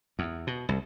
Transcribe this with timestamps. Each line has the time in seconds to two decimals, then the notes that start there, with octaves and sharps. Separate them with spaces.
0.19 E2
0.47 B2
0.69 C2